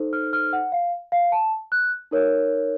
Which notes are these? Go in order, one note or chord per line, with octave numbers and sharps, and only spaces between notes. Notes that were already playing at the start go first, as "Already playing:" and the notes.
Already playing: D#4 A4 C5
F6
F6
F#5
F5
F5
A5
F#6
D#4 A#4 C#5